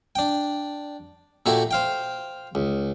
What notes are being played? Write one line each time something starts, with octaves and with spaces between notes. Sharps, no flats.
D4 G5
A#2 A3 E4 F#4 G4
C5 F5 G5
C#2